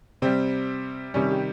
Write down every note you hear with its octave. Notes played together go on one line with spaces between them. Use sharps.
C3 G3 C4
C3 D#3 G3 C#4
G4